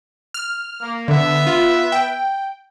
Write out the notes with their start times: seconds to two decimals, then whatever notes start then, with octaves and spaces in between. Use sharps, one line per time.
0.34 F6
0.79 A#3
1.08 D3 B3 E5
1.47 F4
1.92 G5